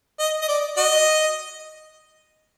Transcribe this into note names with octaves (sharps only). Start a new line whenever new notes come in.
D#5
D#5
D5
F#4 D#5